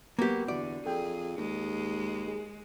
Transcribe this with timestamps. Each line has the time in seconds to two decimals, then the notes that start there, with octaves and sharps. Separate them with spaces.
0.19 F#3 A#3 B3 G4
0.48 E2 D3 F#4 D5
0.86 F2 G#4 A4 G5
1.38 D#2 G#3
2.28 G#4